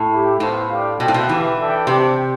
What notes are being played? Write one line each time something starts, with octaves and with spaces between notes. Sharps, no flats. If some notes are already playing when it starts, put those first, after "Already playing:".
Already playing: A2
A3 E4 G4
A2 B3 F4 C5
D4 G4 D5 F5
B2 F4 C5 G5
A2
B2
E3 E4 G4 B4 F5
D4 A4 E5 G5
C3 D4 G4 C5 G5